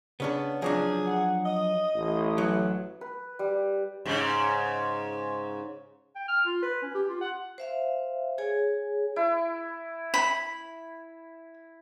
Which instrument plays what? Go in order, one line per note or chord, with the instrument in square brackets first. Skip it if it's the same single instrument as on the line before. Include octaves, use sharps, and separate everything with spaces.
[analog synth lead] C#3 [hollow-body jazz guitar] B3 C#4 D4
[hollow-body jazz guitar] F3 F#3 D4 [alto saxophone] G#4
[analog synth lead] F#5
[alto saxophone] D#5 [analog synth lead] D#6
[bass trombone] A1
[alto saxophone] E3 [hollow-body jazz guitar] F#3
[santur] B4
G3
[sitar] G#2 C#3
[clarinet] G5
F6
F4
B4
C#4
G4
F4
F#5
[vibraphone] C5 E5 F5
G#4 C#5 G#5
[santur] E4
[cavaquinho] B5